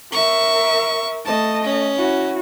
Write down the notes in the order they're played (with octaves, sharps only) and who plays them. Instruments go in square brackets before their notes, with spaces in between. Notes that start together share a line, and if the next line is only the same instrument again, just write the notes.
[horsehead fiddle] A#4 E5 [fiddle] C#6
[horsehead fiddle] A3 D#5 [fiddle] A5
[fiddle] C#4
[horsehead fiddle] E4 F#4